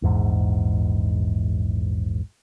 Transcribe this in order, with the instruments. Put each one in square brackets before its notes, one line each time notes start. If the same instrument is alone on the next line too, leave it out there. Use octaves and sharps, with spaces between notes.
[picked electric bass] A#1 E2 G#2